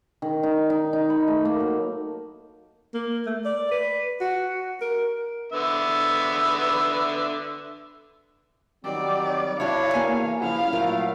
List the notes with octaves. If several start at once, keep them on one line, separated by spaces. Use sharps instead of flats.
D#3
D#4
D#4
D#4
B5
A3
A#3
F#3
A#3
A3
D5
B4
F#4
A#4
D3 B3 E5
D#3 F#3 G3 C4 D5
D4 E4 F#4 C#5 F5
E2 A#3 G#5
G2 C#3 F3 E4 F5
A#2 F#3 A3 F4 A#4